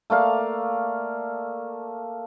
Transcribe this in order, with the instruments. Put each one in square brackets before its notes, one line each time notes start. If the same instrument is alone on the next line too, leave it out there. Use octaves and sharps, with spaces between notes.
[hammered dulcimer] A3 A#3 D5 F5